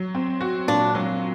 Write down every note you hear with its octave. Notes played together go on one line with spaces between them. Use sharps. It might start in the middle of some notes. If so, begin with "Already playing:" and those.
Already playing: F#3
C4
F#4
A#2 D4
F#3